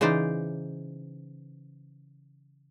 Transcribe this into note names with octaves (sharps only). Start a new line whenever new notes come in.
C#3 E3 D#4 C5 D5